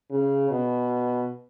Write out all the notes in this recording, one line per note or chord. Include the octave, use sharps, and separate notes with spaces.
C#3
B2